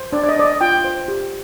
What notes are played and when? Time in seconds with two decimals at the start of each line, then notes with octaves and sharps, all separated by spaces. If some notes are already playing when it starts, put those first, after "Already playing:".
Already playing: C5
0.12 D4 D5
0.24 D5
0.29 D#5
0.36 D4 D5
0.45 D#5
0.61 F4 G5
0.84 C5
1.08 G4